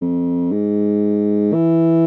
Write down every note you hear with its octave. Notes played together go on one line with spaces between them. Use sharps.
F2
G#2
E3